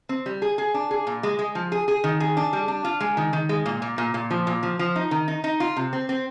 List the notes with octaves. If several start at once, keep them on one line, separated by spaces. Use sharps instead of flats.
C4
G3
G#4
G#4
D4
G#4
A#2
G#3
G#3
F3
G#4
G#4
D#3
G#4
D4
G3
D4
F4
G#3
D#3
D#3
G#3
A#2
A#2
A#2
A#2
F3
A#2
F3
F3
D#4
D#3
D#4
D#4
F4
C3
C4
C4